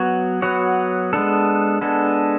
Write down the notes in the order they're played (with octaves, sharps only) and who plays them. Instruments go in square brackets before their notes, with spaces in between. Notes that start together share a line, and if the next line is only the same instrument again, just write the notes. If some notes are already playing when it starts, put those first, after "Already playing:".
Already playing: [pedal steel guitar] F#3 B3 F#4 C#5
F#3 B3 F#4 C#5
G#3 B3 D4 A4
G#3 B3 D4 A4